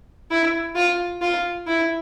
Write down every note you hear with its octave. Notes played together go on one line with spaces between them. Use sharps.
E4
F4
F4
E4